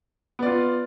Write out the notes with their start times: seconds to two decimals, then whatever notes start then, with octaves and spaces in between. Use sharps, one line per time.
0.39 B3
0.43 D5
0.46 F4